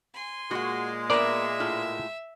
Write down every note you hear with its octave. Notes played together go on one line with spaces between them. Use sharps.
G#5 C6
A#2 G#3 F#4 F#5
B3 A#4 D5 E5
A2 F4